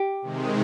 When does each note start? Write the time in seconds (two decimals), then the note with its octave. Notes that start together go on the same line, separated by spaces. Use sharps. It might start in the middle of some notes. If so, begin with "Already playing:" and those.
Already playing: G4
0.22 C3 D#3 G#3